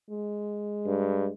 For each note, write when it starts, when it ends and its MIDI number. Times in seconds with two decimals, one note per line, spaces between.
0.11 1.34 56
0.85 1.28 43